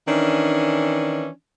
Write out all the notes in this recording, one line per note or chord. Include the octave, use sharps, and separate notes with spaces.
D#3 E3 C#4 D4